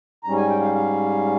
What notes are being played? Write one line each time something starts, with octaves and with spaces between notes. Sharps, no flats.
G#2 G3 C#4 A#5
G#5
G5
F5
F5